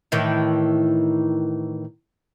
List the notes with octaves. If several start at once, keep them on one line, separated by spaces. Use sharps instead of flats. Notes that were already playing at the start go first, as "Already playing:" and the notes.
A2 D#3 E3